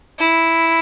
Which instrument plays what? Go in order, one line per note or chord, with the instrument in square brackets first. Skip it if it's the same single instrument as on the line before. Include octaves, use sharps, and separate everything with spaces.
[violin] E4